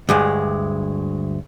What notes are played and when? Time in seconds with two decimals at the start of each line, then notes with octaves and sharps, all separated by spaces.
0.09 D2 G2 G#3